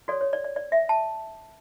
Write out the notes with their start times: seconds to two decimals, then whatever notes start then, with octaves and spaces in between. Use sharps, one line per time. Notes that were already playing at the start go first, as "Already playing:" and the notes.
0.08 F#4 A4 C#5 D5
0.21 C#5
0.33 D5
0.44 D5
0.56 D5
0.72 E5
0.89 A5